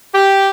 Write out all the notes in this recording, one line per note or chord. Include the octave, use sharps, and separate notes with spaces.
G4